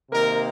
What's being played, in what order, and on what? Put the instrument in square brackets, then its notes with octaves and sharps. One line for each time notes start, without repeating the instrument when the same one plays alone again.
[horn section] C3 D#3 A#3 A#4